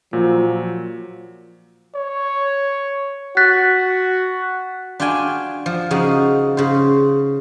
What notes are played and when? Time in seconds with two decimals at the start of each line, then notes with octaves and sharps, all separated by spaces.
0.13 A#2 F3 F#3
1.95 C#5
3.37 F#4 F#6 A6 B6
5.00 D4 F4 F#4 G5 G#5
5.66 F3
5.91 C#3 F3 D#4 F#4
6.57 C#3 C5